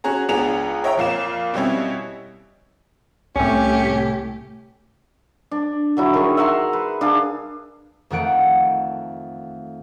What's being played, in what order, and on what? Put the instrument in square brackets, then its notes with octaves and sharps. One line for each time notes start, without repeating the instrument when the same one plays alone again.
[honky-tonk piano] C#4 F#4 G#4 A#5
C#2 B3 D4 G#4 A#5 F7
C#5 D#5 E5 G5 A#5
F2 A#2 F5 E7
B2 G3 C4 C#4 E4
[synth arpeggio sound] C2 A2 [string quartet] A3 G4 [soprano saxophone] C#4
[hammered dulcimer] D4
D3 F#3 E4
D#3 G#4 C#6
E5 F#5 A#5 C6
B4
D4 G#4 F5
[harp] F2 D#3 A3 F#5 D7